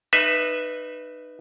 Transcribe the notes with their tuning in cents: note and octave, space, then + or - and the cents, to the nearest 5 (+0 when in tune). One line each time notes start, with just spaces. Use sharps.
D#4 -25 B4 +0 E5 +0